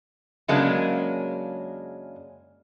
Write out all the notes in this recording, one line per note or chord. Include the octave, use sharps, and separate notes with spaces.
F#2 C#3 F#3 G#3 A#3 D4